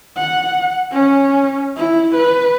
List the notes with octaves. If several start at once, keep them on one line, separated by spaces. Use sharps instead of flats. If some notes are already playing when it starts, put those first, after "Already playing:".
F#5
C#4
E4
B4